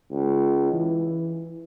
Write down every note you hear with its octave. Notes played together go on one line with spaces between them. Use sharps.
C#2
E3